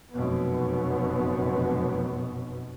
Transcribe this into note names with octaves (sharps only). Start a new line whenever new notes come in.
F1 F#2 B2 B3